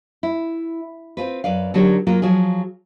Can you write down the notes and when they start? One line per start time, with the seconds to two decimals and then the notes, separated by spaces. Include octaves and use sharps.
0.23 E4
1.17 C4 F4 B4
1.44 F#2 B4 D5 F5
1.74 D3 F#3 D#4 G4 A#4 C#5
2.07 F#3 A#3 F4 G#4 A#4
2.22 F3 F#3 F4 G#4